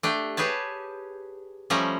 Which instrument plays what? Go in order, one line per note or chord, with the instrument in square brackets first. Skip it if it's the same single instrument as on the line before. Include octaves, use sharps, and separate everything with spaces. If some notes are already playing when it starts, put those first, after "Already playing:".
[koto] A3 D4 G4 G5
G4 G#4 B4 C#5 A5
F3 G3 A3 C#4 G4 A#5